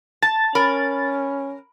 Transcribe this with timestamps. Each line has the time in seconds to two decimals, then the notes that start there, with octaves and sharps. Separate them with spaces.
0.22 A5 A6
0.55 C#4 A#4 B5